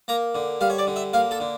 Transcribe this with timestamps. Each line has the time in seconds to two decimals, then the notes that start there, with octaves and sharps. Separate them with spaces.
0.08 A#3 A#5
0.35 D3
0.61 G3 F5
0.70 C#5
0.78 D5
0.87 D3
0.96 E5
1.13 A#3 F5
1.31 A4
1.40 D3